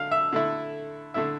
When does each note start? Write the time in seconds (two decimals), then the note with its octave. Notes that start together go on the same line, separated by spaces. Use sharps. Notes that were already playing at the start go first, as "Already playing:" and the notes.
Already playing: D3 F5
0.11 E5
0.33 D3 A3 E4
1.14 D3 A3 E4 E5